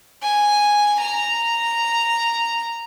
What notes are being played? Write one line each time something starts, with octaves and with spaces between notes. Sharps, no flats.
G#5
A#5